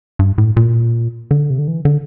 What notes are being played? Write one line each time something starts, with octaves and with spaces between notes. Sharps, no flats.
G2
A2
A#2
D3
C3
D3
E3
D3